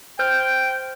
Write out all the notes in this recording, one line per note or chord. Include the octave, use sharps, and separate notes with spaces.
C5 G5 F6 G6